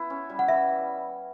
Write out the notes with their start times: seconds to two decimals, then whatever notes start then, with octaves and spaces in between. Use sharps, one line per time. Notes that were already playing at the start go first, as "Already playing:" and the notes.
Already playing: B3 E4
0.10 C#4
0.29 G3
0.39 F#5
0.48 E3 E5